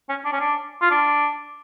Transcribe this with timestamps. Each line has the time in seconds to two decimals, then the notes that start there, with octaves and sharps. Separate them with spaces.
0.09 C#4
0.25 D4
0.33 C#4
0.40 D4
0.82 F4
0.91 D4